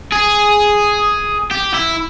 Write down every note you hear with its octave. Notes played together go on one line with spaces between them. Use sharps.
G#4
G4
E4